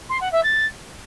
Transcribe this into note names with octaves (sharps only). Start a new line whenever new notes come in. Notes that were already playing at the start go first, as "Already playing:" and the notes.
C6
F#5
E5
A6